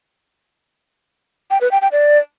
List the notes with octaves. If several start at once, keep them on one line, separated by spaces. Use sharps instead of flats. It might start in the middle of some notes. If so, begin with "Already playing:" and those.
G5
B4
G5
G5
D5